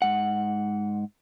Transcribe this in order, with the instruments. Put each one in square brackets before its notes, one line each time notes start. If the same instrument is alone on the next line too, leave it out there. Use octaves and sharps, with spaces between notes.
[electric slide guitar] G#2 F#5